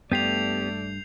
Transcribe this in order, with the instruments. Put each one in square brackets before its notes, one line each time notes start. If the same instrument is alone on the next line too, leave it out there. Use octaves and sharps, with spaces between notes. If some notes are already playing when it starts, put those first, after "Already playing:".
[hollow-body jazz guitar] G2 [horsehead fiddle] A3 D5 [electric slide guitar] B3 G4 [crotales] G6 C7 F7